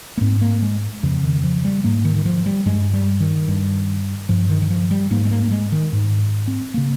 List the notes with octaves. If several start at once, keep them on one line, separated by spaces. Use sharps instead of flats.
A#3
G#2 C4
A#3
G#3
F2 C#3 F3
D#3
F3
G3
G#2 A#3
D#3
D#3
F3
G3
G2 G#3
G3
D#3
G2
G2 F3
D#3
D#3
F3
G3
G#2 A#3
G#3
A#3
A#3
G#3
D#3
G#2
C4
C#3 A#3